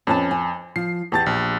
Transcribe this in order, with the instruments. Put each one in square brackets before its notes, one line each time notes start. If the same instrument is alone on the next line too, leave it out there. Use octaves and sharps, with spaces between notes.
[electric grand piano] F2 [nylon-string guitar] C#4 B4 A5
[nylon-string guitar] G#5
[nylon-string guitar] F3 [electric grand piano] C7
[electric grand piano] E2 A5 A6 [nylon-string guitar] B3 G4
[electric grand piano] A#1